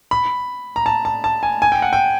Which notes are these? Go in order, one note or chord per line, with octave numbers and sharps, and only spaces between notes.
B5
A#5
A5
A5
A5
G#5
G#5
G5
F#5
G5